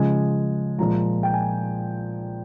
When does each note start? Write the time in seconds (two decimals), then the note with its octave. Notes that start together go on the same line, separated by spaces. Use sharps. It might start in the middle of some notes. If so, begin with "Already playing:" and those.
Already playing: C#3 F3 G#3 G#5
0.78 A#2 F3 G#3 A#5
1.23 G5
1.34 G#5